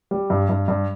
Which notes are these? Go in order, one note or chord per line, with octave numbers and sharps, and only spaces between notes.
G3
G2
G2
G2